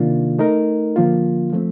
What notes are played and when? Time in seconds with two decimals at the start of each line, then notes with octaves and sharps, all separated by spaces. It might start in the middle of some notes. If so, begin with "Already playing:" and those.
Already playing: C3 D#3 A#3 D4 F4
0.39 A3 D#4 A#4
0.96 D3 F3 A#3 F4
1.53 F3 A3 C4